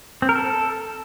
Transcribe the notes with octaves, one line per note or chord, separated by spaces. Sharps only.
C4
A#4
A4